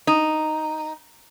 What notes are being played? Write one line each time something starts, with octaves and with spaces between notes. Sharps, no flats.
D#4